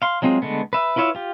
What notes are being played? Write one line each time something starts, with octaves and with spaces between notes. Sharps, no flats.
F5 C6
F#3 G#3 C4 F4 G#4
D3 G#3 A3 B3
B4 E5
E4 F4 B4 C#5 E5
F4 G4